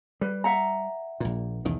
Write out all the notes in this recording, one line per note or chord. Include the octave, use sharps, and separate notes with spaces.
G3 B4
E5 F#5 A#5
A#1 A#2
B1 E2 D#3